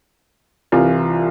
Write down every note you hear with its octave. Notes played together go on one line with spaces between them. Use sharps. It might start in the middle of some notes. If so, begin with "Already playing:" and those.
C2 C3 E3 F4